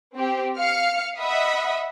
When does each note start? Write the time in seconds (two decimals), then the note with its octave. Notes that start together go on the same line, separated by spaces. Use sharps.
0.17 C4 G4
0.59 F5 F6 C#7
1.18 D#5 E5 F#5 B5 D#6